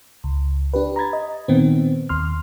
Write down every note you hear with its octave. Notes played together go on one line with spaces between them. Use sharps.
C#2
D4 G4 B4
A#5 B5 G#6 A6
D#5
A#2 D#3 B3 C4
D#2 C6 F6